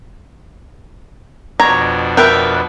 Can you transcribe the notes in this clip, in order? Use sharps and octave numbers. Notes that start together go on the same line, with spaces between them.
F2 B2 D4 C#5 A#5
A#4 B4 E5 G5